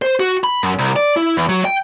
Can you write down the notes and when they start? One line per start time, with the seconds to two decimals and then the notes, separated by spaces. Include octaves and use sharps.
0.02 C5
0.20 F#4
0.44 B5
0.63 F#2
0.79 C2
0.96 D5
1.17 E4
1.37 E2
1.49 F#3
1.65 G5